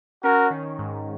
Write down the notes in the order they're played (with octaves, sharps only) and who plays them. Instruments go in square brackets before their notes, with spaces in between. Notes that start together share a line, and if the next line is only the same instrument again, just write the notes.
[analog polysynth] C#4 [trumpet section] F#4 A#4
[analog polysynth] D#3
G#2